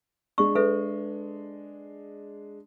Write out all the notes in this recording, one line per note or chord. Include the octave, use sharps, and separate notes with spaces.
G#3 D4 C#6
A4 B4 E5